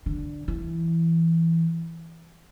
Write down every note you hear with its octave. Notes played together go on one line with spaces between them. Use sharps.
D3
E3